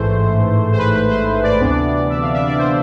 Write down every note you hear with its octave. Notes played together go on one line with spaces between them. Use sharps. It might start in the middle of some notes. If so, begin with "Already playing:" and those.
Already playing: A1 G#2 E3 A3 C5
C5
B4
B4
C5
D5
D2 C3 E3 B3 D4
E5
F5
E5
D5
C5